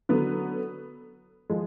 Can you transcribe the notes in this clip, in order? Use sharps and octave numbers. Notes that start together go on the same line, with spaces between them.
D3 F#3 B3
F3 G#3